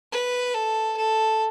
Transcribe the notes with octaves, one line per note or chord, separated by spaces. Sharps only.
B4
A4
A4